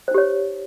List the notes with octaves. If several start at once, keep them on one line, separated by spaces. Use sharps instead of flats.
D#4 G4 C5 C#5